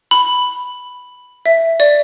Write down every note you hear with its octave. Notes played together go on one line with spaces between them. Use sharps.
B5
E5
D5